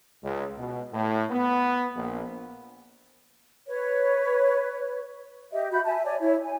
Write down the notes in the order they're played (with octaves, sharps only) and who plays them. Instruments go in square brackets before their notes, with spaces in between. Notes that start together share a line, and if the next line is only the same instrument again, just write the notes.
[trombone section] C#2
B2
A2
B3
A#1
[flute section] B4 C#5
G4 D#5 E5
F#4 E5 B5 G6
E5 G#5 A5
C#5 D5 G#5
E4 C#5 E5
G#5